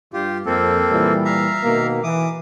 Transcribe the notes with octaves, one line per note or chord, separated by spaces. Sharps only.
G2 F4 G4
F2 A#3 C4 A4
A#2 E3 G3
E5 F5 A#5
B2 D#3 A#3
E3 D6 D#6